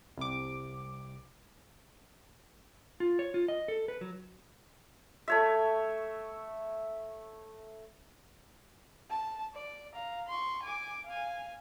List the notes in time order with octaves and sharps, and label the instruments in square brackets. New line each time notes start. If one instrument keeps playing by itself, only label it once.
[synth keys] C2 D6
[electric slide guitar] F4
C#5
F4
D#5
A4
B4
F#3
[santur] A3 C#5 E5
[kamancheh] A5
D5
F5 A#5
C6 C#6
G#5 D6
F5 G#5